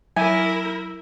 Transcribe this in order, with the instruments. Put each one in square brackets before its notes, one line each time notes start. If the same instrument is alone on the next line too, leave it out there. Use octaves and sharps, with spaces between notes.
[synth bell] F#3 E5 [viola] E4 A#4 [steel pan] G#5